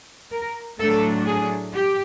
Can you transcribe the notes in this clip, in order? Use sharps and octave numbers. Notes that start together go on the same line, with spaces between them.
A#4
A2 F#3 A3 D4 A4
G#4
G4